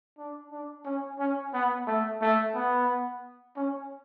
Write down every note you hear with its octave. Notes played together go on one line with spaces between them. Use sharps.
D4
D4
C#4
C#4
B3
A3
A3
B3
C#4